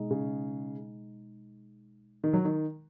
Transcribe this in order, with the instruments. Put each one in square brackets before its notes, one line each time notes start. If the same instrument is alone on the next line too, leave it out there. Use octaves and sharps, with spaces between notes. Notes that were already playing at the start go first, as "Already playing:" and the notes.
Already playing: [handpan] B2 G#3 D#4
[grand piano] C#3
D#3
F#3
D#3